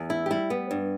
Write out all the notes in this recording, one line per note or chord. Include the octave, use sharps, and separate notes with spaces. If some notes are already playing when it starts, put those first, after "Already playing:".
Already playing: E2
E4
G4
G3 E4
B3
G2